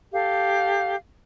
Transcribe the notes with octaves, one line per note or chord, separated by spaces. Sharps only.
G4 A4 F5